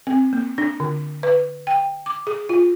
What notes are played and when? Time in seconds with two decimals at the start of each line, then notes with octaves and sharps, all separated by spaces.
0.07 C4
0.33 A#3
0.58 D4
0.80 D3
1.23 B4
1.67 G5
2.06 D6
2.27 G#4
2.49 F4